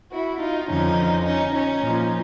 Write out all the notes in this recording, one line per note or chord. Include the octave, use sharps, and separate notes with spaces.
E4 F#4
D#4 F4
F2 D3 F3 C#4 D#4
C#4 D#4
C#4 D#4
A#2 F3